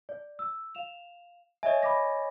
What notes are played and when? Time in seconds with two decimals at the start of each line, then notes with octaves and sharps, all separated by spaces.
0.09 D5
0.39 E6
0.75 F5 E7 F7
1.63 C#5 D#5 E5 G#5
1.82 B5 D6 A#6